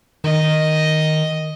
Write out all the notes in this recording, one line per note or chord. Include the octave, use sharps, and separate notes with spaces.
D#3 D#5